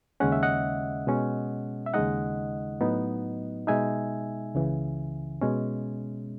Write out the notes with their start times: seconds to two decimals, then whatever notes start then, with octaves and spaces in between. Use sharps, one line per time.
0.20 D#2 C#3 G#3 C#4 F#5
0.32 E5
0.43 D#5 F#5
1.07 B2 G#3 C#4
1.86 E5
1.94 D#2 C#3 G#3 D#4 D#5 F#5
2.81 A2 F#3 B3 D#4
3.67 B2 G#3 D#4 E5 G#5
4.55 C#2 C#3 E3
5.41 B2 G#3 C#4